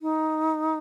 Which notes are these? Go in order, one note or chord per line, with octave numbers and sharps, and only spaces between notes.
D#4